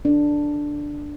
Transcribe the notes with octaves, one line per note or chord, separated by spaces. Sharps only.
D4